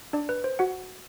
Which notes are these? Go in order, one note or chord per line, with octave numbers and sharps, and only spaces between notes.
D4 D5
B4
C5
F#4 F#5